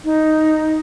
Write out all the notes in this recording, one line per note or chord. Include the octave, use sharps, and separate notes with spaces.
D#4